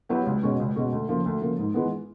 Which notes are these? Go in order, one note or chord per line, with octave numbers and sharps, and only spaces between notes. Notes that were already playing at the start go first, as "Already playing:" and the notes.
F#3 B3 E4 G4
C#2
B2 G#3 C#4 F#4
C#2
B2 G#3 C#4 F#4
D2
C#3 F3 A#3
D2
C#3 F3 A#3
G#2
E3 G#3 B3